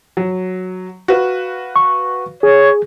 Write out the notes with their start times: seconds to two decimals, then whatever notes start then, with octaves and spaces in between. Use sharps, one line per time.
0.17 F#3
1.08 F#4 B4 F5
1.76 C#6
2.43 G#4 C#5